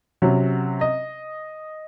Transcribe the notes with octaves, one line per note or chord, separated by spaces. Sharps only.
C3 F#3 C#4
D#5